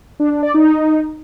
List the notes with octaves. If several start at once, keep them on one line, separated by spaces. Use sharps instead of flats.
D4
D4
D5
D#4